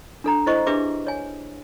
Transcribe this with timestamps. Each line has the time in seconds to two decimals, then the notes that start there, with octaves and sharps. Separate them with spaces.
0.24 D4 A4 A#5
0.46 E4 A4 C5 D#5 C#6
0.67 D4 G4 G#4 B4 E5 D6
1.07 C#5 G#5